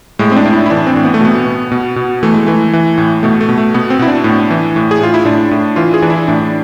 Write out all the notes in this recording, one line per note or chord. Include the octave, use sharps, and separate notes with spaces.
A2 G#3
C4
D4
A2
E4
E4
E3 D4
C4
A2
B3
A3
B2 B3
B2
B2
B2
E3 A3
G#3
E3 A3
E3
A2
B2 A3
A3
B2
A3
B2 B3
C4
B2 E4
D4
A2
E3
A2
G#4
A2 F4
E4
A2 D4
A2
E3 F4
G#4
E3 D4
E4
A2 D4